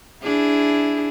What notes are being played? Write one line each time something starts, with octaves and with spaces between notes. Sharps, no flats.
D4 E4 G#4